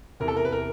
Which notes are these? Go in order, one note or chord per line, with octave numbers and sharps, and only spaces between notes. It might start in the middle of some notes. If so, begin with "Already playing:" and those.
E2 C3 E3 A#4
A4
A#4
B4
A#4